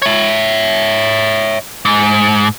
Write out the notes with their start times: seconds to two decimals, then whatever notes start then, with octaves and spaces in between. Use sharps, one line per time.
0.02 C#5 E5
1.85 G#2